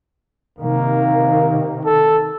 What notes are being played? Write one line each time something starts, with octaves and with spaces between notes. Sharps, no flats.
C3 D#3 A#3
A4